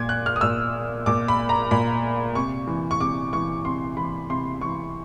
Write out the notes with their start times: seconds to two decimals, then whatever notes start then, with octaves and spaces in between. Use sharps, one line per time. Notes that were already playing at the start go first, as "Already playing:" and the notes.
Already playing: A#2 G#6
0.09 F#6
0.26 F6
0.36 D#6
0.41 A#2 E6
1.06 A#2 D6
1.28 B5
1.49 A#5
1.71 A#2 B5
2.35 C3 C#6
2.67 E3
2.91 C#6
3.00 C3 D6
3.33 E3 C#6
3.65 C3 C6
3.97 E3 B5
4.30 C3 C6
4.61 E3 C#6